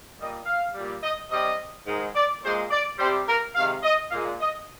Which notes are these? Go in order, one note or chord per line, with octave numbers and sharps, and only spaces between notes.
A#2 G3 D#5
F5
A#2 G3
D#5
C3 G3 D#5
G#2 D#3 G#3
D5
A#2 G#3 C5
D5
C3 G3 C5
A#4
C3 D#3 G#3 F5
D#5
A#2 G#3 F5
D#5